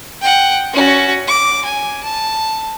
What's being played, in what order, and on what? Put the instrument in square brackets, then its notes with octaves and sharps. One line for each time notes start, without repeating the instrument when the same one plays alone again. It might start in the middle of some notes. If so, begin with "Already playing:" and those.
[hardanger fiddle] F#5 G5
C#4 F#4
D6
G#5
A5